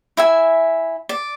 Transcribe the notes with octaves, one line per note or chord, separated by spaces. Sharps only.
E4 E5 G#5
D5